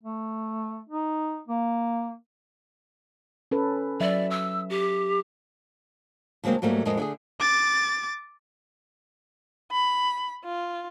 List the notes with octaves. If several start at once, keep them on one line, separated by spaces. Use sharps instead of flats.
A3
D#4
A#3
C#4 A4 B4
F#3 D5 E5
E6
G4
D2 F#3 G#3 A#3 C4
G#2 F#3 G3 A3 A#3
F2 A2 G#3 A#4 D#5
D3 A3 G#4
D6 A6
B5
F4